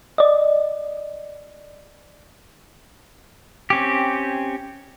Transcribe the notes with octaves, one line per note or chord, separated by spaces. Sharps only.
D5 D#5
C4 C#4 G4